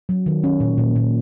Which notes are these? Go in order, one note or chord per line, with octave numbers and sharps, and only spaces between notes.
F#3
D#3
C#4
A#2
A#2
A#2